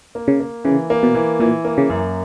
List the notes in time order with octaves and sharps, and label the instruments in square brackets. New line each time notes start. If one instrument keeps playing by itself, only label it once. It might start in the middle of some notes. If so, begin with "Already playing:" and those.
[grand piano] A#3
[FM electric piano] C#3
[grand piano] A#3
[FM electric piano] C#3 [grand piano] E3
[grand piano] A#3
[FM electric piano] B2
[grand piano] E3
[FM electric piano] A#2 [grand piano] E3
[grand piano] A#3
[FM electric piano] C#3
[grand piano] F#2